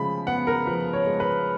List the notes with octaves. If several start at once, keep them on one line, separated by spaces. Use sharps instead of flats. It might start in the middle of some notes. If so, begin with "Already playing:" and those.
Already playing: C#3 F3 G#3 B5
B3 F#5
A#4
F3 B4
C#5
G#3
B4